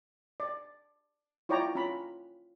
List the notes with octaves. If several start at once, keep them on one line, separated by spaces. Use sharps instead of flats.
D5
E4 F4 C#5 D5 G5 A#5
C#4 F4 A#5 B5